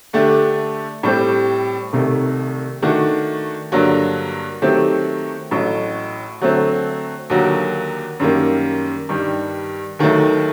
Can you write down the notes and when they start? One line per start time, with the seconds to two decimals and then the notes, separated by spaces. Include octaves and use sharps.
0.13 D3 A3 D4 G4
1.03 A2 G3 C4 G4
1.93 C2 C3 D#3 A3
2.82 D#3 A3 D4 F#4
3.72 G2 D3 F#3 A#3
4.62 D#3 F#3 A3 C4 G4
5.51 A1 A2 F#3
6.41 D3 F#3 A3 C4
7.30 D#2 D3 F#3 A#3 F#4
8.20 F#2 D#3 G3 A#3
9.09 G2 D#3 G3
9.99 D#2 D#3 F#3 A3